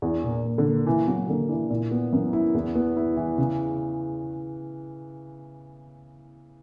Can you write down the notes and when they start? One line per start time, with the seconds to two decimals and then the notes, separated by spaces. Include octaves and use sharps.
0.02 E2 D4
0.24 A#2
0.45 A#3
0.58 D3
0.65 A#3
0.86 C#3 E3
1.07 F#3 A#3
1.28 D3 A#3
1.49 E3 D4
1.70 A#2 E4
1.91 B3
2.12 F#2 E3
2.33 E4
2.54 E2 B3
2.75 B3
2.97 E4
3.17 E3
3.38 C#3